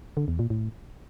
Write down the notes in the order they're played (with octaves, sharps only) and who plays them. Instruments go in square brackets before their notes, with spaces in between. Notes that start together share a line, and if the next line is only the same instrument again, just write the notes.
[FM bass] D3
E2
A#2
A2